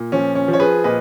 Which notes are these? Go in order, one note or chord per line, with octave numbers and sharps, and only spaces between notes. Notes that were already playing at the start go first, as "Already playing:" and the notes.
Already playing: A#2
F3 C#4
C#4
F3
C#5
G#4 B4
A#2 B4 D#5